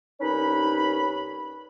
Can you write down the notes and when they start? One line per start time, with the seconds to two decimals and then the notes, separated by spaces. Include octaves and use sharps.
0.21 C2 C#4 D#4 B4 B5